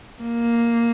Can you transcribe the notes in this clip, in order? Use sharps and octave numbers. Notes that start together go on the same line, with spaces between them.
A#3